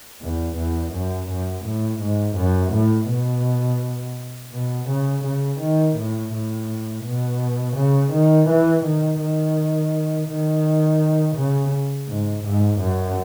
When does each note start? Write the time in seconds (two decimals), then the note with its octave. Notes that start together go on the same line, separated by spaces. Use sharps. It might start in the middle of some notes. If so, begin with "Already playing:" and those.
0.22 E2
0.57 E2
0.93 F#2
1.29 F#2
1.65 A2
2.01 G#2
2.37 F#2
2.73 A2
3.09 B2
4.53 B2
4.89 C#3
5.24 C#3
5.60 D#3
5.97 A2
6.32 A2
7.04 B2
7.77 C#3
8.13 D#3
8.49 E3
8.84 D#3
9.21 D#3
10.28 D#3
11.36 C#3
12.08 G#2
12.44 G#2
12.80 F#2